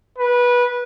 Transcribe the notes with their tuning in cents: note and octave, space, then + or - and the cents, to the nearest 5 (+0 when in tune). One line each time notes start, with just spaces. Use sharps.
B4 -20